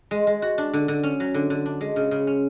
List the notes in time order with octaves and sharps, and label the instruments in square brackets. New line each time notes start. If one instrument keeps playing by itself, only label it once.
[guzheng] G#3
G#3
F#4
D4
D3
D3
C#4
F#3
D3
D3
D4
G#3
C#3
C#3
C#4